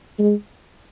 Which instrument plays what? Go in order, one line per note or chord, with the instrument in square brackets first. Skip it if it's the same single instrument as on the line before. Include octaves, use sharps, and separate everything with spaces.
[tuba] G#3